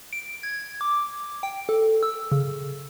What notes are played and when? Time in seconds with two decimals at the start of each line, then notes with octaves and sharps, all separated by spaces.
0.13 D7
0.43 G#6
0.81 D6
1.43 G5
1.69 A4
2.03 E6
2.32 C#3